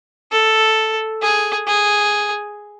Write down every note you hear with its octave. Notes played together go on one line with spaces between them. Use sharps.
A4
G#4
G#4